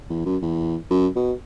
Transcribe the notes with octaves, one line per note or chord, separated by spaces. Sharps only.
E2
F#2
E2
F#2
B2